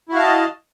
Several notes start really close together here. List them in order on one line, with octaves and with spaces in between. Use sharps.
E4 F#4 F5 A5 D#5